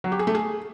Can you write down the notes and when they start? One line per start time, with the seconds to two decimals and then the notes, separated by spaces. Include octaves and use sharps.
0.04 F#3
0.12 G4
0.19 G#4
0.27 A3
0.35 G#4